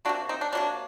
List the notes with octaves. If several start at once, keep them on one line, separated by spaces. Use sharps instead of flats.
C3 F#3 A#3 D4 F#4
C4 D#4
D4
C3 F#3 A#3 D4